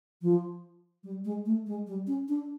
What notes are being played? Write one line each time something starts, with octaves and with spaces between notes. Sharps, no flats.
F3
G3
G#3
A3
G#3
G3
C#4
D4